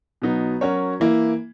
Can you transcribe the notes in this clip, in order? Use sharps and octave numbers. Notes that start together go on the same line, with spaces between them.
B2 F#3 B3 D#4
F#3 C#4 F#4 A#4 C#5
E3 A#3 E4